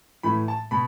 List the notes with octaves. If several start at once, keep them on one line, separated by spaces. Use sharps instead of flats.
A2 E3 A3 B5
A5
B2 B5